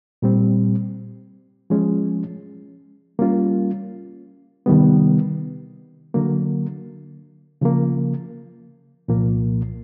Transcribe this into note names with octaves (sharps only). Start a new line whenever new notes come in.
A#2 G3 C4
F3 G#3 C#4
G3 A#3 C#4 F4
C3 D#3 G3 B3
D3 F#3 A#3
C#3 F3 A#3
C2 A#2 F3 A#3